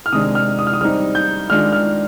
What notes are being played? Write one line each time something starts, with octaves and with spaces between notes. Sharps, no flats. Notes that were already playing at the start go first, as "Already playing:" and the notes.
F6
C3 D#3 G#3 D4 D#6
F6
D#6
F6
D#6
G3 C4 D#4 F6
G6
D#3 G#3 D4 F4 F6
F6